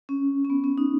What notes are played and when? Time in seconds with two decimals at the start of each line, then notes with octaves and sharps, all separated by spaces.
0.09 C#4
0.45 C#4
0.50 B3
0.64 C#4
0.78 D#4